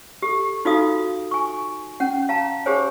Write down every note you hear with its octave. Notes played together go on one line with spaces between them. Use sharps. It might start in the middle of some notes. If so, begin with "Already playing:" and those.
G4 A4
D#4 F4 F#4 A4 F5 D#6
G#5 C#6
C#4 F#5
F5 A5 A#5
G4 G#4 A#4 C5 C#5 G#5